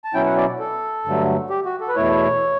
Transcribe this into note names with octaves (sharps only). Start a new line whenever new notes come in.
A5
B2 F#3 C#4 E4 G5
F#5
D5
A4
G2 D3 F#3 A3
G4
F#4
A4
B4
E2 B2 A3 E4 C#5